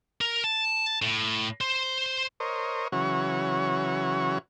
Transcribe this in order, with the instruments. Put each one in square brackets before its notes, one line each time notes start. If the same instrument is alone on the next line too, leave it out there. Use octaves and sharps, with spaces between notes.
[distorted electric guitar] A#4
A5
A2
C5
[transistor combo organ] A#4 C5 C#5 D#5
C#3 E3 F#3 F#4 C#5